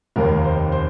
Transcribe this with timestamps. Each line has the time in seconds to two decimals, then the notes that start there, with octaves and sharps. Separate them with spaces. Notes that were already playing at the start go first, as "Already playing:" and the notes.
0.16 F1 D#2 D#3 A#3 A#4
0.44 C5
0.72 C5